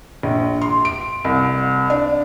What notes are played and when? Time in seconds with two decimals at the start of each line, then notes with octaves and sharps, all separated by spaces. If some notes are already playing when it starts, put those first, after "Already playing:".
0.23 A#1
0.61 C6
0.85 D7
1.24 C2
1.90 D4